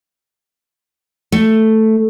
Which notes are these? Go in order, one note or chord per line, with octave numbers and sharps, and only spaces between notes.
A3